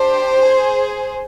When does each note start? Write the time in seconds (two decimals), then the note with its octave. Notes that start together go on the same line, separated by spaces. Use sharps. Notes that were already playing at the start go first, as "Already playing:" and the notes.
Already playing: D4 G4 C5
0.44 G#4